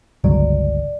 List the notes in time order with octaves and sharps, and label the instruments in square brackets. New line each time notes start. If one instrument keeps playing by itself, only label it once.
[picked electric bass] G1 C#2 F#3 [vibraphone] D5